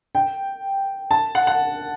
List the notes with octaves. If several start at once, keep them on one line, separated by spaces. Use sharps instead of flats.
G5
A5
F#5
F#5